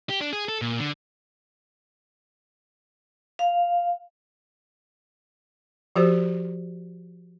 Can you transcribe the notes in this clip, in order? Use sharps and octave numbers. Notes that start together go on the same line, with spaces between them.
G4
D4
G#4
A4
A#2
D3
F5
F3 F#4 G4 C5